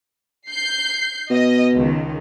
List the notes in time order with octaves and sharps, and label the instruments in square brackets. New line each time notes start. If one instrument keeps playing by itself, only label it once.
[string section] G6 C7
[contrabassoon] B2 [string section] D#5
[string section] C#2 D#3